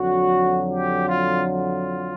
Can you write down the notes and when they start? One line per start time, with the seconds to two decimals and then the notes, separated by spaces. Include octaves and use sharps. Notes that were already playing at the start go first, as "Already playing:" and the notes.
Already playing: F2 D3 F#3 F#4
0.70 G4
1.08 F4
1.48 F4